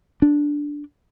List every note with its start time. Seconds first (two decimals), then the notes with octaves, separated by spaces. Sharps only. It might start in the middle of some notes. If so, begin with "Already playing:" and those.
0.22 D4